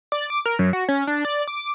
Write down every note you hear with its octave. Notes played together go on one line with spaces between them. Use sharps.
D5
D6
A#4
F#2
F#4
C#4
D4
D5
D6